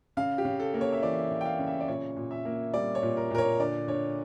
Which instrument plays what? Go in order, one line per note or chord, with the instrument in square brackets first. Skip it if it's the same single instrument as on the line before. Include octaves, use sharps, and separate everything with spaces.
[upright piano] C#3 F5
G4
C#3
A4
A#3
C#5
E5
E3 D5
C#3
G5
F5
C#3
E5
D5
A#2 C#5
A#2
E5
A#3
G3 D5
C#5
A#2
A#4
A#2 A#4
C#5
D3 D5
D3 C#5